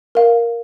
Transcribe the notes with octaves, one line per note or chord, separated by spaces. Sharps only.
A#4 F5